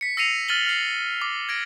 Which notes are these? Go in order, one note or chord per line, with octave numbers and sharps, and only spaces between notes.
B6 C#7
E6 A#6 C7 C#7 D#7 F7
F6 A6 D#7 F#7 G7
F6 C7
D6
G#6 A#6 D7